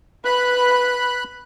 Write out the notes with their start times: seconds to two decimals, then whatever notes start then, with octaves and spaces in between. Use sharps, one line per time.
0.25 B4 B5 F#6